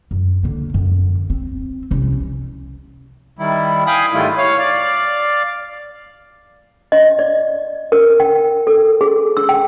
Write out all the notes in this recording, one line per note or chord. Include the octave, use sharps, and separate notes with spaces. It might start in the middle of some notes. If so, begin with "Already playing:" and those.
F#2
D3 A#3
F#2 D3
C4
C2 C#4
D#3 G3 E4
F5 G5 G#5 B5 D#6
G#2 D#3 G3 A3 E4 F4
C#5 F5
D5 F5
D#5
D5
A#4
G5
A4
G#4
E6
G5